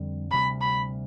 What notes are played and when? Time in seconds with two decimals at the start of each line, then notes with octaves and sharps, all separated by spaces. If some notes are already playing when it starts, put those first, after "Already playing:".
Already playing: F2 D3 G3 C4
0.31 D2 C3 G3 B5
0.61 B5